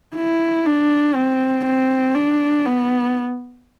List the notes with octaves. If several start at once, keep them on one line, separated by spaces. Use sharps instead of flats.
E4
D4
C4
C4
D4
B3